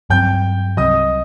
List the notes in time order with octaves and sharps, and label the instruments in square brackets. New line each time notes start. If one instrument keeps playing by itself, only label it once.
[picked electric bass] G2 F#3 C4 [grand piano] G5 G6
[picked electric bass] C2 C3 F#3 [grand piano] D#5 D#6